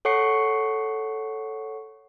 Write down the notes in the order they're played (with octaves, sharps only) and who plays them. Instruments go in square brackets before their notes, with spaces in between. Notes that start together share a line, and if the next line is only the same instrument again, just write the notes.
[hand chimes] A4 C#5 F#5 C#6 C7 C#7